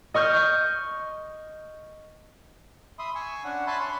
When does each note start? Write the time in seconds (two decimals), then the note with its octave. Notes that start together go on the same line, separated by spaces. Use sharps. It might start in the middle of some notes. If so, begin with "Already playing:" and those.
0.14 D#5 C#6 F6 G6
2.99 E5 B5 C6 D#6
3.15 G#5 C#6 E6
3.44 C#4 D4 F#5
3.67 E5 G#5 A5 B5 C6 F#6
3.80 C#5 B5 C6